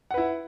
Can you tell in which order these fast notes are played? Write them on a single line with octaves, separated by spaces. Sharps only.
F#5 B4 E4